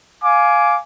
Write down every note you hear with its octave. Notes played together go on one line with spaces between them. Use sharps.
F5 G#5 D6